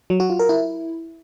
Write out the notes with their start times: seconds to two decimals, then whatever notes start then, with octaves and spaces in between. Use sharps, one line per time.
0.10 F#3
0.20 F#4
0.30 F4
0.39 A#4
0.49 E4